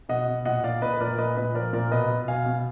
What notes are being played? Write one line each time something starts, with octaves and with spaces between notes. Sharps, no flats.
B2 D#5 F#5
B2
A#2 D#5 F#5
A#2 D5 F5
A#2 B4 D#5
B4
A#2 A#4 D5
A#2 B4 D#5
A#2 B4 D#5
F3 A#4 D5
A#2 A#4 D5
B2 B4 D#5
B2
B2 F5 G#5
B2